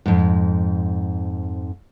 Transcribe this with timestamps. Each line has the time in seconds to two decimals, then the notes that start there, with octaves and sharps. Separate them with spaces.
0.06 F2 G#2